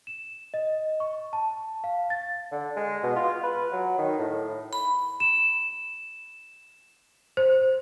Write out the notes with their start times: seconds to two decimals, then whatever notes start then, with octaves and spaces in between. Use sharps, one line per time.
0.07 E7
0.54 D#5
1.00 C#6
1.33 A5
1.84 F5
2.10 A6
2.52 D3
2.76 G#3
3.03 B2
3.16 F4
3.44 B4
3.72 F#3
3.98 D#3
4.19 A2
4.73 B5
5.20 E7
7.37 C5